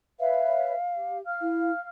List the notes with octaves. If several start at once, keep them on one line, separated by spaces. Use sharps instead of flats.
B4 C#5 E5 F5
G4
F5 F6
E4